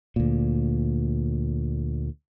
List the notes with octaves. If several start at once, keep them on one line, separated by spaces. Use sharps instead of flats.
D2 A#2